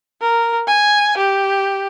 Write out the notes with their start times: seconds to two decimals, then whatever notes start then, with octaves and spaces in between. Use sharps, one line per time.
0.21 A#4
0.67 G#5
1.17 G4